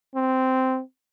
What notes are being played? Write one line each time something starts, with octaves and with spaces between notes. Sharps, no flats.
C4